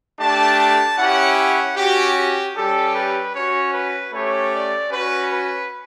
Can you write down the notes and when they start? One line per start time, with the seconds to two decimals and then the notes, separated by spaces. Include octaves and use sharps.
0.19 A3 D4 G4 A5
0.59 A5
0.98 C#4 E4 G4 F#5
1.38 F#5
1.77 C#4 F#4 G4
2.16 G4
2.55 G3 C#4 G4 A4
2.95 B4
3.34 C#4 F#4 C#5
3.73 B4
4.12 A3 C#4 G4 C#5
4.52 D5
4.91 C#4 F#4 B4
5.31 B4